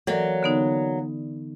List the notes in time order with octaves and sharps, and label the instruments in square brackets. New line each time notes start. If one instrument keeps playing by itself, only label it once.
[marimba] E3 A4 D5 [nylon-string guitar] F#3 A#3
[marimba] D3 B3 D#4